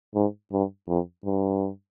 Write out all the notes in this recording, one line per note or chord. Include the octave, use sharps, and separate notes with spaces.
G#2
G2
F2
G2